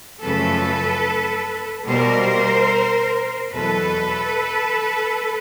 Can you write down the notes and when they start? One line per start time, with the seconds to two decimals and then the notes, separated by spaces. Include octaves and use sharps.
0.22 F#2 C#3 F3 A3 A4 B4
1.87 B2 G3 A#3 A#4 C5
3.53 E2 B2 F#3 A4 B4